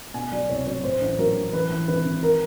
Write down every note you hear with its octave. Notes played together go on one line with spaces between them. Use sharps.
B2 G#5
F#3 D5
C2 C#5
F#3 C#5
A2 C5
A1
F#3 A#4
A1
E3 B4
E3
G#1 B4
G#1
A#4